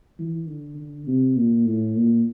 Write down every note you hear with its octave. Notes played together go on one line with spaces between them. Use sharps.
E3
D3
D3
C3
A#2
A2
A#2